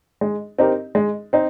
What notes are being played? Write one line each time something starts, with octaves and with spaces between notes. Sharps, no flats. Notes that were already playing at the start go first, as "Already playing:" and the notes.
G#3
C4 D#4 G4 A#4
G#3
C4 D#4